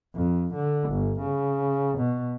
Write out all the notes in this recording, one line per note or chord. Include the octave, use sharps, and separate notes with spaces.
F2
D3
G1
C#3
B2